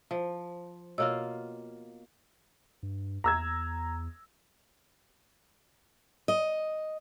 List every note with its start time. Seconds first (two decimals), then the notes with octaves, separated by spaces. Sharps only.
0.11 F3 C5
0.98 B2 A#3 F4 C#5 E6
2.83 G2
3.24 E2 A#5 E6 G#6
6.28 D#5